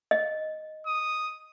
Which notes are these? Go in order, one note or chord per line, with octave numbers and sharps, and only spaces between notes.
D#5
D#6